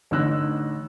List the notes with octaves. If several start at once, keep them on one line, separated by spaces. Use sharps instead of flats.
A1 D3 D#4 E6 F#6 A#6